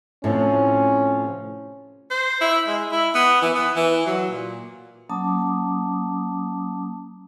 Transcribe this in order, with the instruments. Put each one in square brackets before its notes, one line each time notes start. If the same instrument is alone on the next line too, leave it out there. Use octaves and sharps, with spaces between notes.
[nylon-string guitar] A2 C3 F3 [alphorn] C#4
[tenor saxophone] C5
E4
G#3
E4
B3
E3
B3
E3
F#3
A#2
[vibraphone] F#3 A#3 C#4 A5 D6 D#6